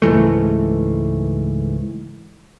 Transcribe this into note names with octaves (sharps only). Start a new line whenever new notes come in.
C#2 G#2 E3 A3